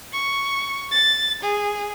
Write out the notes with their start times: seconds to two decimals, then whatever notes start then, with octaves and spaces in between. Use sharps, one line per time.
0.13 C#6
0.91 A6
1.43 G#4